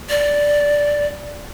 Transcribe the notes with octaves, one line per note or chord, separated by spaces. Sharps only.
D5